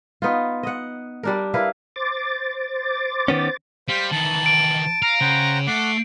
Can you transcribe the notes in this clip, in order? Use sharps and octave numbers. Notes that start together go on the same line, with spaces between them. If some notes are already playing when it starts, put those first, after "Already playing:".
B3 D#4 F4
D#5 F#5
G3 D4 A#4
E4 A#4 B4 F5
C5 D6 A6
D#3 B3 C#4
G3 C5 F5 B6
D#3 E3 A5 F#7
D7
F5 A#5
C#3 C5 F#5 G5
A3 F#5 D6 C7